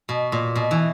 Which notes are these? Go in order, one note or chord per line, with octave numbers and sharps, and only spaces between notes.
B2
A#2
B2
E3